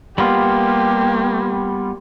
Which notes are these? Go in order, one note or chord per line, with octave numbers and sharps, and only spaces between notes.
G3 A#3 B3 F4 G4